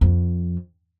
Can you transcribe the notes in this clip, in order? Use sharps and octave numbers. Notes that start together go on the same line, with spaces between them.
F2